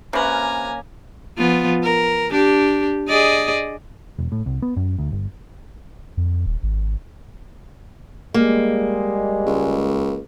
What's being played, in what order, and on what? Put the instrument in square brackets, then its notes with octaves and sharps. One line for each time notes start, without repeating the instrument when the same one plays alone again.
[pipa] C3 B4 [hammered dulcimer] A#3 C#4 [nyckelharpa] G#5 A#5
[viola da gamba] F3 B3 F4
A#4
D4 G4
G#4 D5 D#5
[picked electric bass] E1
A2
C2
B3
F#2
D2
G1
[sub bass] F2
D#1
G#1
[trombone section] G3 G#3 [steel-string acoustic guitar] A#3
[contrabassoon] C#2